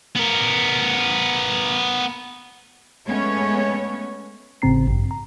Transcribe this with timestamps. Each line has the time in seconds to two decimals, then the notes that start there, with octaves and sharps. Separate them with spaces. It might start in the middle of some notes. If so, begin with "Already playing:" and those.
0.16 B3 A#4
3.07 G#3 A3 B3 C#4 C#5
4.62 G#1 A2 C#3 C4 A#5 C7
4.87 A1 G2
5.11 A#5